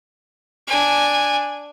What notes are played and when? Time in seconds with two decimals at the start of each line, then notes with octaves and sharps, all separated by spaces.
0.67 D4 G#5